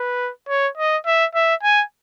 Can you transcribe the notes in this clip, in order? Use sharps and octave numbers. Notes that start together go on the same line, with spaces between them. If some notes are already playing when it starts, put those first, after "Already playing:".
Already playing: B4
C#5
D#5
E5
E5
G#5